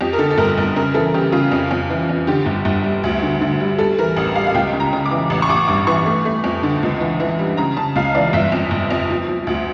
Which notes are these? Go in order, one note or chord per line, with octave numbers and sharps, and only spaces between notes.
F2 G4
A#4
D3 A4
A4
G1 A#4
G1 A#4
C#3 A#4
E3 A4
C#3 G4
C#3 F4
F2
F2
E3
F2
D3 G4
G1
G1
G3
D2
D3
D3
G3
G3 A4
E3 A#4
A1
G3 F5
F5
C#2 G5
C#3
A#5
C#3
D6
E3
A1
C#6
A1 D6
G2 D6
E3 C#6
A3
A3
F2
D3
C#2
E3
E3
G3
C#3 A#5
C#3 A5
C#2 F5
E3 D5
G1 E5
F2
G1
F2
F3
F3
D2